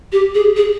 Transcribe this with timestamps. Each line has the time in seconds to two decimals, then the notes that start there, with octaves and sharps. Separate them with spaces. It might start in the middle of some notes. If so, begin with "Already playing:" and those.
0.12 G4
0.35 G#4
0.57 G#4